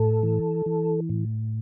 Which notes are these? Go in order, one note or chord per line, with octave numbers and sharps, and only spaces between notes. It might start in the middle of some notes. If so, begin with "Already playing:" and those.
Already playing: A2 A4
E3
E3
A2